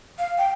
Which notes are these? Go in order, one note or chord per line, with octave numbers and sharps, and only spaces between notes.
F5
G5